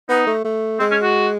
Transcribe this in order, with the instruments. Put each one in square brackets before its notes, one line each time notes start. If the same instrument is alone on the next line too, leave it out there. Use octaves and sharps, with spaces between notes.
[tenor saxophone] B3 [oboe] D#4
[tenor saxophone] A3
A3
[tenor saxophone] G#3 [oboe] C4
[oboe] C#4
F#4